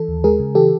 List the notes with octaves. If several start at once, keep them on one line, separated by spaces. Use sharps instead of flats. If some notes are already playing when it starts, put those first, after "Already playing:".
Already playing: E3 A4
D#2
G#3 G#4 A#4
C#3
E3 G4 A4